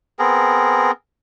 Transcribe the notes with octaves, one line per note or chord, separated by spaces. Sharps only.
B3 C4 G#4 A#4